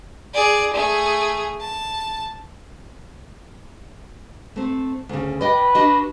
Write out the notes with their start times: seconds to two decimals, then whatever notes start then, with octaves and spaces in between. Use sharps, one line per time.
0.34 G#4 D5
0.74 A3 G#4
1.60 A5
4.56 A3 C4
5.09 D2 C#3
5.41 B4 D5 D#5 G5
5.75 D4 F#4 D#5